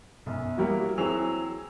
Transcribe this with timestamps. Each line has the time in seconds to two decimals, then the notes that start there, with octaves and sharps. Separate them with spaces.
0.26 B1 F#2
0.57 F#3 G3 A#3 E4 F#4
0.98 E3 F#3 C4 G#4 E6 F7